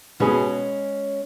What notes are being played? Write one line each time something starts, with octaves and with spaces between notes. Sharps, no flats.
B2 G#3 B3 C#4 G#4